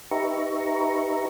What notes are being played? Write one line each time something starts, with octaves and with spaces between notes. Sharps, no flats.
D#4 G4 B4 E5 A#5 C#6